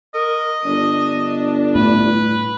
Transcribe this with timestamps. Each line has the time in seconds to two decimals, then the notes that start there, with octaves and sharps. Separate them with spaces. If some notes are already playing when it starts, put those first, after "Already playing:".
0.15 A#4 D#5
0.66 G1 D4
1.75 A2 B4